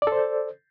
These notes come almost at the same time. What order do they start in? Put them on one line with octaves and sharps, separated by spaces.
D5 A4 C5